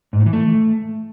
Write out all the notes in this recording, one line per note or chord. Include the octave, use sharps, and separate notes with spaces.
G#2
A2
E3
A3